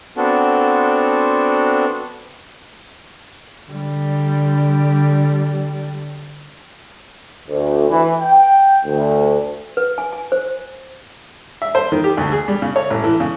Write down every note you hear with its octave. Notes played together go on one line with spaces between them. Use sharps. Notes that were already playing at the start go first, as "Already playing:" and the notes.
B3 C4 D4 F#4 A4
D3 G3
D2
E3
G5
D2
B4
G#5
G#5
C5
E5
C5
D#3
G4
D2
G#4
G3
C#3
C#5
A1
E3
C#3